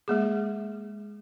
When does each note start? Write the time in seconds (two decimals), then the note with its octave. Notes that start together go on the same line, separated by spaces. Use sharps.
0.08 G#3 A#3 G#4